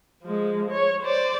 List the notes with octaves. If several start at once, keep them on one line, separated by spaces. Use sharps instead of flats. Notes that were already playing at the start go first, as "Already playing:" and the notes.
F3 G#3
C#5
C5 D5